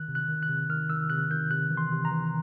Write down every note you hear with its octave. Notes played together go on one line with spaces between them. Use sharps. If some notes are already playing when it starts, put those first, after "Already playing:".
Already playing: D#3 F#6
C3
F#6
D#3
F#6
C3
D#3 F6
D#3 E6
C3 F#6
D#3 G6
C3 F#6
E3
C6
C3
A#5
E3